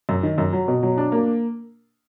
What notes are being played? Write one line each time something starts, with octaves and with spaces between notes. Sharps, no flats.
F#2
D#3
F#2
F#3
B2
F#3
D4
A#3